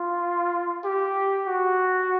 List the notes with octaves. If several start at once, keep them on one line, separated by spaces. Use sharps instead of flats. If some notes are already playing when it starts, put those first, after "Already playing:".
Already playing: F4
G4
F#4